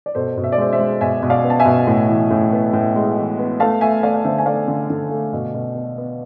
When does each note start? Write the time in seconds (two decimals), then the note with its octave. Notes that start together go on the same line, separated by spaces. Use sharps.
0.06 D5
0.15 B2 A4 C5
0.37 B2
0.44 E5
0.52 D5
0.58 G#3 C5 E5
0.73 C5 E5
0.79 G#3
1.01 B2 E5 G#5
1.23 B2
1.30 D5 F5
1.44 B3
1.50 A5
1.60 E5 G#5
1.66 B2
1.87 A2
2.09 E3
2.30 A2
2.53 B3
2.73 A2
2.96 G#3
3.17 E3
3.39 B3
3.60 A3 F5 A5
3.81 A3 E5 G#5
4.03 A3 D5 F5
4.14 F5
4.24 D3 C5 E5
4.38 G#5
4.46 A3 D5 F5
4.68 D3
4.90 D3
5.11 A3
5.33 B2
5.54 B2
5.75 B3
5.98 B3